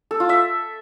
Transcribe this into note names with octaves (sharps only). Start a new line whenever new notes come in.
A4
F4
E5